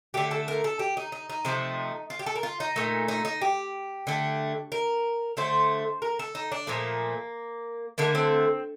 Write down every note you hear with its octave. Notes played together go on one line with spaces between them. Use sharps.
D3 A3 G4
A4
A#4
A4
G4
D#4
D#4
D#4
C3 F3 A3
F4
G4
A4
A#4
F4
D#4
A#2 A3
D#4
D#4
G4
D3 A3
A#4
D3 A3 C5
A#4
A4
D#4
D4
A#2 F3 A3 A#3
D3 A3 A#3
C4